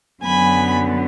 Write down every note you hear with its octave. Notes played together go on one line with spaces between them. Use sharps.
F#2 D3 F#3 B3 G#5 B5